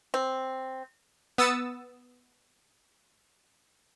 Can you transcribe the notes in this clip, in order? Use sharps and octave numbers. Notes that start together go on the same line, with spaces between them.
C4
B3 D#6 E6 A6 C#7